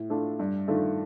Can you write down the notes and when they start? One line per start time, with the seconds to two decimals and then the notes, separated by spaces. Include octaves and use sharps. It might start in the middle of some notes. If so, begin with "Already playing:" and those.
Already playing: A2
0.10 A3 D4 F4
0.40 G2
0.68 D#3 A3 D4 F4